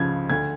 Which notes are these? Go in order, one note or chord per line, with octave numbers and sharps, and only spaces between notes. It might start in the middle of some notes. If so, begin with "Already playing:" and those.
Already playing: C#2 C#3 F3 G#6
D2 G#6